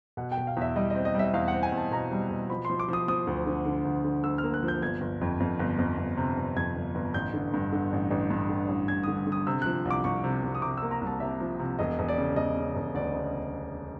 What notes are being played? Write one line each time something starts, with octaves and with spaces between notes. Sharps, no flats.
B2 F#5
G5
B2
F5
E2 E5
G3 D#5
C4 D#5
D#5
G3 E5
E2 F5
C4 F#5
G#5
E2
A5
B2 A#5
G3
B2
F3 B5
C6
F3
D6
F3 D#6
F3 D#6
D2
D3
D3
D2
D3
D2 E6
F6
A#3
F#6
F3
G6
G1 G#6
G1
F2
F2
G1
F2
G1
C3
G1
F2 G#6
G1
G1
A1 G6
D3
G2
D3
A1
A1
G2
D3
A1
A1 G#6
D3 D#6
D#6
D3
D#6
C3 E6
F3 F#6
C2
D6
C2 C#6
C3
C2
D#6
C3 D6
A#3 E6
A#5
C2
A5
C3 E5
F3
C3
E1 D#5
E1
D5
C#3
E1 D#5
C#3
E1
D2 D5
C#3